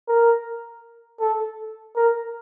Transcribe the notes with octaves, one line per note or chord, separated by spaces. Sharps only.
A#4
A4
A#4